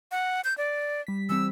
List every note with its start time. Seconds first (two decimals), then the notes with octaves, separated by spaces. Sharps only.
0.11 F#5
0.44 G6
0.58 D5
1.07 G3 B6
1.29 E3 G3 C4 E6